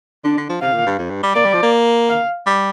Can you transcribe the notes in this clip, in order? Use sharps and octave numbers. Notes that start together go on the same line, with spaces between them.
D3 D4
D3
F3
C3 F5
A#2
G2
F2
G2
G3
A#3 D5
G3
F3
A#3
F5
G3